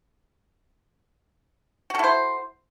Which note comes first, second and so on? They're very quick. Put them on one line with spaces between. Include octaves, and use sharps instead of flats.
F#4 A4 E4 C5